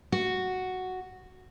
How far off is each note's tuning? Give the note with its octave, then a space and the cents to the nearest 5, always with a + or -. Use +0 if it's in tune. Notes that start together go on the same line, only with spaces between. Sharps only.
F#4 +0